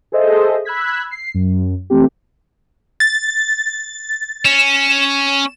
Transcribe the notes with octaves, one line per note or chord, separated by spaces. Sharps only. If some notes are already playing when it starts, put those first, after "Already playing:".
G#4 A4 C5 D#5 E5
B5 E6 F#6 G#6 B6
C7
F#2
E3 A3 C4 G4
A6
C#4 E7